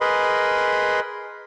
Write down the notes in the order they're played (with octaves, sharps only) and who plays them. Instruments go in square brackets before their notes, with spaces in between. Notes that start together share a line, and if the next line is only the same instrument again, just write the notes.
[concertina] G#4 A#4 B4 D#5 B5 C6